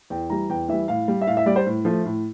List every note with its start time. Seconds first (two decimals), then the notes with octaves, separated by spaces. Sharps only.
0.10 E2 G5
0.30 E3 G3 A#5
0.50 E2 G5
0.69 E3 G3 E5
0.88 A2 F5
1.08 G3
1.21 E5
1.27 A2 F5
1.37 E5
1.46 G3 D5
1.56 C5
1.66 A2
1.85 F3 A3
2.05 A2